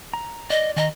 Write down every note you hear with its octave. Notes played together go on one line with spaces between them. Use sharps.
A#5
D5 D#5
D#3 D#5 G#5 A#5